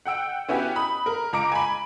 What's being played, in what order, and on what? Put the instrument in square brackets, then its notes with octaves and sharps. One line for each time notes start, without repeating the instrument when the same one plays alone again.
[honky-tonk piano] F#5 G5 E6 D7
B3 C#4 E4 F#4 G4
B5 D#6
A#4
C#2 A#5 D6 D7
G#5 B5